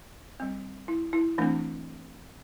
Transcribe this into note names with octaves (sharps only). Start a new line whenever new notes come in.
G3 C4
E4
E4
E3 A3 C4 D4